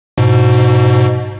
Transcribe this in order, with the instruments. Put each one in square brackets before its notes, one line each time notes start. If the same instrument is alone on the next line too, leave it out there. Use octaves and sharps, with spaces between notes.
[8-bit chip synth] G#2 B2